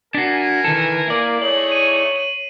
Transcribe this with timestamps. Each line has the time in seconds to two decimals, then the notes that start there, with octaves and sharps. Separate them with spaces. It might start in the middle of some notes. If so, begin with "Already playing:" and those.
0.15 D4 F#4 A#4 G#5 B6 C7
0.64 D#3 E3 A4
1.08 A#3 E4 D5
1.42 A3 D#4 G#4 C#5 F#7
1.71 D#7
2.15 D#7 F#7